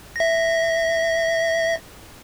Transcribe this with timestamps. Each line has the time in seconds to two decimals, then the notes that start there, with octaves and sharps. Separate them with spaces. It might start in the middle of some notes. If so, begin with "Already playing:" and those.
0.16 E5 A#6